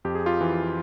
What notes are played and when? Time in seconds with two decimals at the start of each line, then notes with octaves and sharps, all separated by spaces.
0.05 F2 G4
0.15 G#4
0.26 F4 G4
0.41 E3